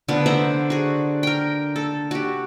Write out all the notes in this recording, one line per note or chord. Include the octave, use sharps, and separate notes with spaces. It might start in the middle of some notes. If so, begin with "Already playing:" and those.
D3 F3 B3
C5 E5 F#5 A#5
F#4 G#4
A#4 G5
A4
F#4 G4